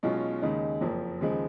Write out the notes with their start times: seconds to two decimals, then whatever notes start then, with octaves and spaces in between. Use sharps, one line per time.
0.03 B1 B2 G#3 C#4 F4
0.42 D#2 C#3 G#3 D#4
0.81 F#1 F2 F3 A#3
1.21 D#2 C#3 F3 G#3